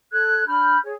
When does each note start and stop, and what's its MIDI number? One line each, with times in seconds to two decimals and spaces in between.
0.12 0.45 69
0.12 0.45 90
0.12 0.45 92
0.47 0.77 62
0.47 0.77 83
0.47 0.77 89
0.47 0.77 91
0.84 0.93 68
0.84 0.93 73